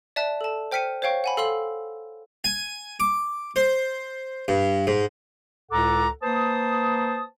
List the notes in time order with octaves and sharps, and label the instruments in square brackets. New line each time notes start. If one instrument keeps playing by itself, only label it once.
[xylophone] D5 E5 A5 F#6
A4 A5
C5 G5 F6 B6 C#7 D#7
C5 C#5 F5 G5 C#6
F#5 G#5 B5
A4 F5 C6 E6 F#7
[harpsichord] G#5
D6
C5
G2
G#2
[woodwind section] C#2 A2 A4 F#5 A#5 D6
A#3 B4 C5 A5 D#6